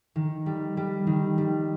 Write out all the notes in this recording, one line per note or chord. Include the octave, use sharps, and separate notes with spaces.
D#3
G3
G3
D#3
G3